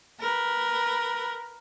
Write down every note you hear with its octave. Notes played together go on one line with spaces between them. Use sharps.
A#4 B4